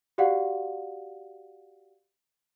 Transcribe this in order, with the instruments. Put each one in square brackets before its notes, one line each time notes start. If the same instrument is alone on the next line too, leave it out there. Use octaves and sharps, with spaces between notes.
[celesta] F#4 G4 D5 F5 F#5